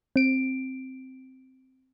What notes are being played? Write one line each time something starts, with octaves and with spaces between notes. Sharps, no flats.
C4 D7